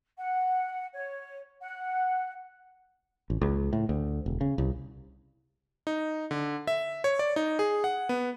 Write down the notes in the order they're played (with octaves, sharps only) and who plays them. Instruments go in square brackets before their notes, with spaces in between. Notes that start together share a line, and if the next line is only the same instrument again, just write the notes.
[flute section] F#5
C#5
F#5
[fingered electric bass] A1
C#2
A2
D2
E1
C#3
C2
[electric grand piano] D#4
D3
E5
C#5
D5
D#4
G#4
F#5
B3